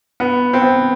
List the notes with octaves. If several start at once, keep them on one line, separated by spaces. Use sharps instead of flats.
B3
C4
B3